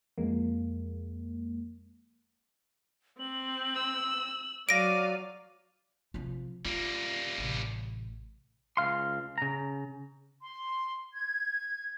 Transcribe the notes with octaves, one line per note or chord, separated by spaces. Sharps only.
F2 G#3 A#3
C4 F#7
E6
F#3 D5 F5 A#6 D7 D#7
C3 F3
G3 A#3 F4
A1 C3
C#2 F5 C6
C#3 A#5
C6
G#6